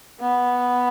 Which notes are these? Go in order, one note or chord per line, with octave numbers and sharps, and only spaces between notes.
B3